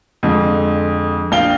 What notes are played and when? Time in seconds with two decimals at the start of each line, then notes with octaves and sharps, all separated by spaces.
0.23 F2 D3 G#3
1.32 A#1 F5 G5 G7